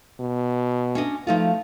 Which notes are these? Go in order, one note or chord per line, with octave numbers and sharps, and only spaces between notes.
B2
C#4 D4 D#5
F3 A3 D#4 F4